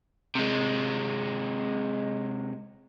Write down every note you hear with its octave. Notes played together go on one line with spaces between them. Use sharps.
C3 G#3